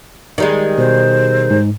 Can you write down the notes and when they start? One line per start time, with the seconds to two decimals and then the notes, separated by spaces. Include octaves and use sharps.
0.38 D#3 G3 G#3
0.78 B2 C5
1.50 G#2